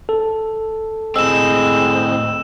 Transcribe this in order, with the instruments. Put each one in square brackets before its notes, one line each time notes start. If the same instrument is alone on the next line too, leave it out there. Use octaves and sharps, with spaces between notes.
[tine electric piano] A4
[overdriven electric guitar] A2 C4 [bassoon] G#3 [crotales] E6 E7